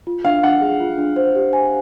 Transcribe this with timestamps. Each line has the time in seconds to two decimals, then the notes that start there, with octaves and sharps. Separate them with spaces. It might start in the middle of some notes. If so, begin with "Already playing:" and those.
0.07 F4
0.25 D4 F5
0.43 D4 F#5
0.61 G#4
0.80 F4
0.98 D4
1.16 C5
1.35 G4
1.53 G#5